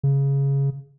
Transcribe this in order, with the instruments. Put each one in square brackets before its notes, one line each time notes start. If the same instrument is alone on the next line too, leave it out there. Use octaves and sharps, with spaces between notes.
[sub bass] C#3